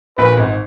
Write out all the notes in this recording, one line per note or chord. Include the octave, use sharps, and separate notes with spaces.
A#1 A#2 B4
G#1 G#2